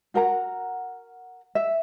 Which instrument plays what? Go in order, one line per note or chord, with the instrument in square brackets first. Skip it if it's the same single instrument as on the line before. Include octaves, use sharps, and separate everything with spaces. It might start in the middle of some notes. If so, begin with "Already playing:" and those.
[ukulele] F#4 A#4 F#5 A#5
E5